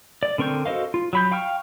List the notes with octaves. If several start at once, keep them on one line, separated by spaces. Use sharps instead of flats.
D5
D3 C4 A#4 C#6 G6
F#4 A4 C5 D#5 F5
F4
F#3 B5 G6
F5 G5 C#6 F6